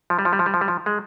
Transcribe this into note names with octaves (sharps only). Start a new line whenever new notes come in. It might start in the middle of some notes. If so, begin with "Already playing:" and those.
F3
G3
F3
G3
F3
G3
F3
G3
F3
G#3